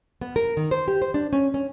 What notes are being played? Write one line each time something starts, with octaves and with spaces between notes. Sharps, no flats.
B3
A#4
D#3
C5
G4
C5
D4
C#4
C#4